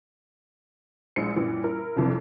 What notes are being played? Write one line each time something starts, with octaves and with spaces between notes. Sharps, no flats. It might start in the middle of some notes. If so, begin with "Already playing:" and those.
A#1 G#3 E4 C5 C#7
F#2 A#2 E3 G3
E4 A#4
G1 C2 F2 C3 E3 F3